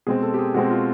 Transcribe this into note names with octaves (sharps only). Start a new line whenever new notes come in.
B2 G#3 C4 G#4
A4
G4
G#4
B2 G#3 C4 F#4
F4